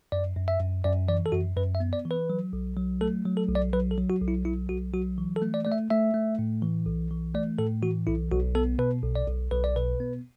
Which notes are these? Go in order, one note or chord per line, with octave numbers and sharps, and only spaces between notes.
F#2 D5
F#2
E5
F#2
F#2 D5
E3 D5
A4
F#2 F#4
F#2 B4
E5
B3
D5
E3
B4
F#3
B1
F#3
A3 A4
F#3
A4
B1
D5
F#3 B4
A4
F#3
F#4
B1
E4
F#3 E4
B1 F#4
F#3 F#4
E3
A4
A3
D5
A3 D5
E5
A3 E5
A3
A2
E3
B1
E3
A3 D5
A2 A4
E3 F#4
B1 E4
B1 F#4
B3 A4
B2 B4
B1
D5
B1
B1 B4
D5
B2 B4
B3